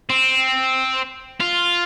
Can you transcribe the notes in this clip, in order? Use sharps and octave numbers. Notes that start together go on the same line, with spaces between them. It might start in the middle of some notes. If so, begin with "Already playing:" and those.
C4
F4